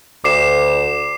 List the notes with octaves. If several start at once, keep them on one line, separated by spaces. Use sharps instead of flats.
D2 D6 C7 E7